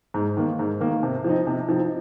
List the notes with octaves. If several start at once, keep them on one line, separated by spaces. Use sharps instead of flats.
G#2
D#3 A#3
G#2
D#3 A#3
C3
F3 C4 D#4
C3
F3 C4 D#4